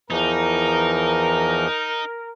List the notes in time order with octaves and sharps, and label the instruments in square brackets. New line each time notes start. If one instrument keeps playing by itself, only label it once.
[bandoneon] E2 E3 F3 [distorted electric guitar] D#4 [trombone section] A#4